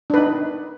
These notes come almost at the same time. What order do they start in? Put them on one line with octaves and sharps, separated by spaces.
D4 B4 D#4